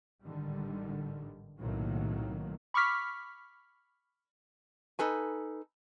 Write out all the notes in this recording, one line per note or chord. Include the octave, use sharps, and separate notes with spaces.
A1 G#2 D3 D#3 G3
B1 A2 C3 D#3 F#3 A#3
B5 C#6 D6 F6 B6
D#4 A4 B4 G#5